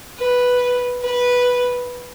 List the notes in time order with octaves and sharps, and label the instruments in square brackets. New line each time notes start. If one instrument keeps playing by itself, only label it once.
[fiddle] B4
B4